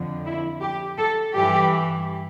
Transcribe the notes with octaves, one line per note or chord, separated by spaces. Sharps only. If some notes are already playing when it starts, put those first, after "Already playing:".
Already playing: F2 D3 F3
E4
G4
A4
G2 E3 G4